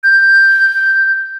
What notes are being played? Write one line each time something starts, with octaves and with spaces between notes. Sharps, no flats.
G6